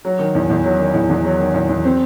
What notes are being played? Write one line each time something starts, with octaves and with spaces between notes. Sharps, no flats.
F#3
D#3
E2
E2
F#3
D#3
E2
E2
F#3
D#3
E2
E2
C4